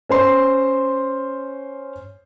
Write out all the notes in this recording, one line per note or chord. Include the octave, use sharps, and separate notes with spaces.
C#4 C5 C6